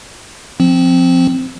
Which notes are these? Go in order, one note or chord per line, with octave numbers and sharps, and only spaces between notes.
F3 C4